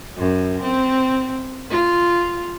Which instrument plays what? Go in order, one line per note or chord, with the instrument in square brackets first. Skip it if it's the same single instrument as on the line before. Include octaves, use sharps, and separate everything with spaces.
[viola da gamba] F#2
C4
F4